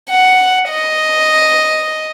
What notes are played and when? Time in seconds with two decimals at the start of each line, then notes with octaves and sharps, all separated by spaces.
0.10 F#5
0.70 D#5